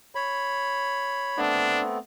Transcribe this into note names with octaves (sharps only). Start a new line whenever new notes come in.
C#5 B5
A3 B3 C4 D4